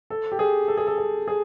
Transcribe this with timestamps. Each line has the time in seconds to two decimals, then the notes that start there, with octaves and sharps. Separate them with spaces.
0.10 A4
0.32 G4
0.39 G#4
0.68 A4
0.77 G#4
0.87 A4
0.98 A4
1.28 G#4